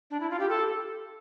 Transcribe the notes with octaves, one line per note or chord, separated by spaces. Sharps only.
D4
E4
F4
G4
A4